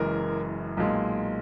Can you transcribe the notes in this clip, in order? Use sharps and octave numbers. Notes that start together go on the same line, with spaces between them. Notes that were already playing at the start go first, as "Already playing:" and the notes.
Already playing: F#1 F#2 E3 G#3 A#4
B1 A#2 G#3